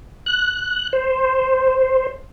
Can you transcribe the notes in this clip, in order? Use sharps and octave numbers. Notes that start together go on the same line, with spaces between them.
F#6
C5